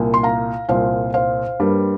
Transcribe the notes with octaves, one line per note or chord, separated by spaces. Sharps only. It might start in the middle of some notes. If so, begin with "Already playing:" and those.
Already playing: C2 A#2 A#3
C6
F5 A#5
C2 A#2 A#3 C5 F5
C5 F5
G2 G3 A#3